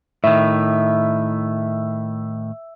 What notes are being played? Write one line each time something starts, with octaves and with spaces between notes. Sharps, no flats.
A2 D#3 E5